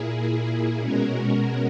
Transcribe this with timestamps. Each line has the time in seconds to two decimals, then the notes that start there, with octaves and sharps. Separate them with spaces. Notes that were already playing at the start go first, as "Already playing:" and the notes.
Already playing: A#2 A#3 E4 G#4
0.80 B2 G#3 C#4 F#4 A#4